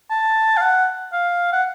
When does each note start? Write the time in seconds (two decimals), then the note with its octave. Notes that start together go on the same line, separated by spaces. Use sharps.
0.10 A5
0.57 F5
0.61 F#5
1.13 F5
1.53 F#5